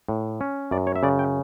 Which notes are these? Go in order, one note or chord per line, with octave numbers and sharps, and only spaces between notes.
A2
C#4
F#2 D5
C#5
E5
C#3 D5
G5